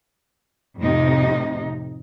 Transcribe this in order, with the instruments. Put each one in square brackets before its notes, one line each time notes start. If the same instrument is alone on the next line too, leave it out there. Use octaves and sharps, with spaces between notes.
[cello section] F2 A2 C3 D#4